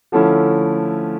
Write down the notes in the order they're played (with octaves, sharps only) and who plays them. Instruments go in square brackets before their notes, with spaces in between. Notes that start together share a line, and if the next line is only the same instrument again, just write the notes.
[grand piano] D3 F3 A3 C#4 E4